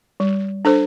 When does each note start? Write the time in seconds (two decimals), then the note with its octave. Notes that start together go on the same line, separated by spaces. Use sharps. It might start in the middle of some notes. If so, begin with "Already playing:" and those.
0.20 G3
0.65 D4 A4 C5